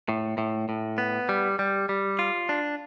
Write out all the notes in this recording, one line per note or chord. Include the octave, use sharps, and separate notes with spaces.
A2
A2
A2
B3
G3
G3
G3
F4
D4